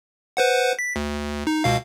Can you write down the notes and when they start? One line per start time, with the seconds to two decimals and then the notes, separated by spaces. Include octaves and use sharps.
0.37 B4 C5 F#5
0.79 B6
0.96 D2
1.47 D#4
1.64 C#2 B2 F5